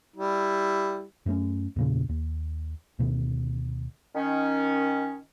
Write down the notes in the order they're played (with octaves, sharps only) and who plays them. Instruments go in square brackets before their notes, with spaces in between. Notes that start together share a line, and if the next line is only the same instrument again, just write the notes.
[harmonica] G3 E4
[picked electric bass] F#2 A3 C4 C#4
E2 A#2 C#3
D#2
D2 B2 D#3
[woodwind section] D#3 C#4